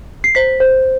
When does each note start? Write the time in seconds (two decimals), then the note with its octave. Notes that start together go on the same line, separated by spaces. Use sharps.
0.24 C7
0.35 C5 B6
0.60 C5